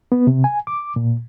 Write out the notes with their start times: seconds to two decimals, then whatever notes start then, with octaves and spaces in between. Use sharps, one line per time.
0.12 B3
0.27 C3
0.44 G#5
0.67 D6
0.96 A#2